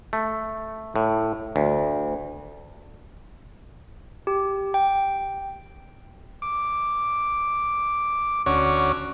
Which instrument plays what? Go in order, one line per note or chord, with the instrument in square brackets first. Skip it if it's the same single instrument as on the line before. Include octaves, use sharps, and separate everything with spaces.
[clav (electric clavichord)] A3
A2
D2
[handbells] G4
G5
[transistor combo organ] D6
D2 C#4 F#4 C#5 D5